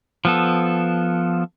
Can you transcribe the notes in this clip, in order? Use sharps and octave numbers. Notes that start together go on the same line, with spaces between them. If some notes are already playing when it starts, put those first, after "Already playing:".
F3 B3 A4